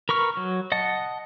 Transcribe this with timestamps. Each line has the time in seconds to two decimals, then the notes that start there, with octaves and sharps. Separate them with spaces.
0.09 A#4 B4 C#6 F6
0.37 F#3
0.72 D#5 F#5 A5